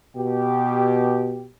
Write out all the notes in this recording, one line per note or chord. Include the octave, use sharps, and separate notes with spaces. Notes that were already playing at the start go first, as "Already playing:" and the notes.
B2 G4